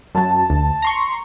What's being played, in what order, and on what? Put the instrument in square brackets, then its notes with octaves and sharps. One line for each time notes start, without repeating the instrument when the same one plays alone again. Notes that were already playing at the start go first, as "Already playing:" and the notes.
[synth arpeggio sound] F#2 F#3 [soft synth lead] A5
[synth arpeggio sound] D2
A#5 C6 C#6